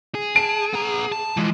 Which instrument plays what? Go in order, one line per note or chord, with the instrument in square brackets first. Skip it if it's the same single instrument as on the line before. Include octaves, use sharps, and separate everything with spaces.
[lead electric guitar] G#4
[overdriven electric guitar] A5 [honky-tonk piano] D7
[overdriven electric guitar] B3 A#5
A5
[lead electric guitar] E3 F3 [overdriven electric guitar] G#3